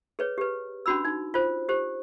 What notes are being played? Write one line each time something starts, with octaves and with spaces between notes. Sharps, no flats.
G#4 B4 C#5
G4 B4
C#4 D4 F#4 B5 E6
D#4
F4 C5
G4 C5